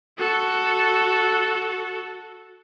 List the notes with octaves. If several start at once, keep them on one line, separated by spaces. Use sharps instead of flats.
F#4 A4